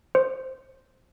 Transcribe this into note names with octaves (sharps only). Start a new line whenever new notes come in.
C5